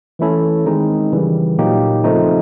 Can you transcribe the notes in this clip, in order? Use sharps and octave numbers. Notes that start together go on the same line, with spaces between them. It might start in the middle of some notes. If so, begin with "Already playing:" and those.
E3 A3 C#4 E4 A4
D#3 G#3 C4 D#4
C#3 E3 G3
A#2 F#3 A#3 D#4 G4
C#3 F3 A3 C4 D#4